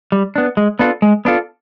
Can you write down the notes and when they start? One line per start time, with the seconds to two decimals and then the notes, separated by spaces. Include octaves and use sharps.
0.12 G3
0.36 B3 D4
0.57 G#3
0.79 B3 D4 F4 A4
1.02 G#3
1.25 B3 D4 F4 A4